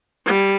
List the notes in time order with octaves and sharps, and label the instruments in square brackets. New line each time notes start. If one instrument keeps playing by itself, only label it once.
[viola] G3